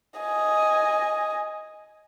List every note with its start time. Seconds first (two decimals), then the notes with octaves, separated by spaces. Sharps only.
0.20 D#5 G#5